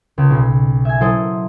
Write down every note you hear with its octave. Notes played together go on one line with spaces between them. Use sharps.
C#2
B1
E5 G#5
F#3 E4 A4 C5 D#5